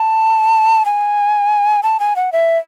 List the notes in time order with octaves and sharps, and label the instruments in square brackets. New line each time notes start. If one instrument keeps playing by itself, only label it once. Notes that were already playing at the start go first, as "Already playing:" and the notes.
Already playing: [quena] A5
G#5
A5
G#5
F#5
E5